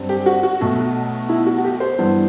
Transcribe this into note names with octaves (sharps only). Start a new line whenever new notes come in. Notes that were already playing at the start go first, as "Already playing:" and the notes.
Already playing: G2 F#3 C4
G4
F#4
F#4
B1 B2 A3
E4
F#4
F#4
G4
C5
G2 E3 B3